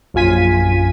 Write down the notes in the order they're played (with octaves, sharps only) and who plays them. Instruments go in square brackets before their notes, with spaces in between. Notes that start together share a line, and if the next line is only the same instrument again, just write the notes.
[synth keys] A#1 F#2 F4 G#5 B6 D#7